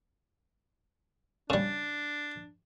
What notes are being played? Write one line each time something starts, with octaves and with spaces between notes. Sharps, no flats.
C#3 G3 D4